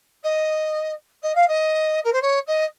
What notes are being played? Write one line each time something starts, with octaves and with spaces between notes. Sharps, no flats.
D#5
D#5
F5
D#5
A#4
C5
C#5
D#5